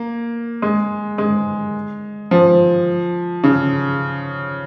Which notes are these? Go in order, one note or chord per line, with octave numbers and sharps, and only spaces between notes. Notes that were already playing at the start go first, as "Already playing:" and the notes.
Already playing: A#3
G#3
G#3
F3
C#3